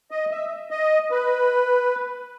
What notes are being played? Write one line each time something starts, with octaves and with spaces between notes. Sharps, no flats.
D#5
E5
D#5
B4